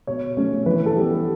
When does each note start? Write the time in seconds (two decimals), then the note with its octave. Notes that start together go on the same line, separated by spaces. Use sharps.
0.07 B2 C#5
0.37 A3 C#4
0.66 E3 B4
0.86 A4
0.96 G3 B3
1.05 G4